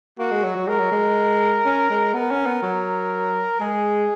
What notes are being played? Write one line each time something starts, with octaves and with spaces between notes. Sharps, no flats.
A#3 F#4
G#3
F#3
F#3
G#3 A#4
F#3
G#3
C#4
G#3
B3 A#4
C#4
B3
F#3
G#3 G#4